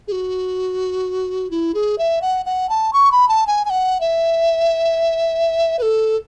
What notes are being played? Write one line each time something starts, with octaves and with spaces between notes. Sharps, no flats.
G#4
F#4
E4
G#4
E5
F#5
F#5
A5
C#6
B5
A5
G#5
G#5
F#5
E5
B4
A4